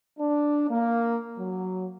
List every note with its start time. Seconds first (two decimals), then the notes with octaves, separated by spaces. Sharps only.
0.19 D4
0.70 A#3
1.39 F#3